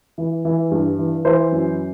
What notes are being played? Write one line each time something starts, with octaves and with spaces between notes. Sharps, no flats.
E3
E3
G2
E3
E3 C5
F#2